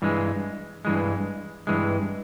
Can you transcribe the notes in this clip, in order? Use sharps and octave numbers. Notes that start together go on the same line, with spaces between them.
G2 E3 G#3
G2 E3 G#3
G2 E3 G#3